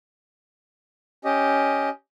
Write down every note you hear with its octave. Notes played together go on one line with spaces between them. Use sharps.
C#4 G4 D#5